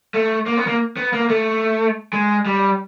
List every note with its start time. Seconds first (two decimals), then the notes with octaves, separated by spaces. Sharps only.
0.14 A3
0.46 A#3
0.57 B3
0.67 A#3
0.97 B3
1.13 A#3
1.29 A3
2.13 G#3
2.45 G3